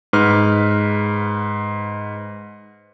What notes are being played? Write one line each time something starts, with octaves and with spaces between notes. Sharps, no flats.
G#2 B4 F6